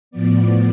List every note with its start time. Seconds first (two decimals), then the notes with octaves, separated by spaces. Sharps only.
0.11 A2 F3 B3 D5